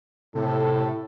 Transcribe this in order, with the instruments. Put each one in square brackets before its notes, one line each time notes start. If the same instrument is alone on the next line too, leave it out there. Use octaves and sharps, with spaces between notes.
[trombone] A2 [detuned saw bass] C3 [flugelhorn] A4